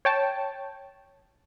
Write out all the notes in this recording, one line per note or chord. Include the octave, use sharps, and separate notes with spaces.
C#5 G5 A5